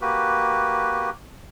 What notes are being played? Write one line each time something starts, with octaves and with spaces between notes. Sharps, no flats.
A#3 F#4 G4 B4